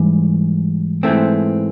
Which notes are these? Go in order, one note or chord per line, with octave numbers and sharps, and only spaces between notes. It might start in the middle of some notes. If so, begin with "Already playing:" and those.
Already playing: G#2 E3 G3
G#2 E3 A3 C4